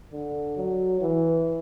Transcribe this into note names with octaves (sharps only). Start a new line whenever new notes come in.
D3
F#3
E3